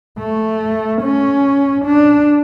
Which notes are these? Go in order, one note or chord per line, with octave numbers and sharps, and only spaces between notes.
A3
C#4
D4